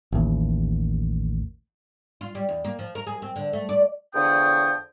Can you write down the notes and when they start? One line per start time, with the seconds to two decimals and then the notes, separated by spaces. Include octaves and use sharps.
0.12 A1 D#2
2.21 F4
2.35 G3
2.49 E2
2.64 A#3
2.79 F3
2.95 A#4
3.07 G#4
3.22 C4
3.36 D3
3.53 A3
3.69 D5
4.15 E2 D3 F3 C#5 G5 D#6